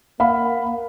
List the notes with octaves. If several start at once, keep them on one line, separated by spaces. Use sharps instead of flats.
A#3 F5 F#5 B5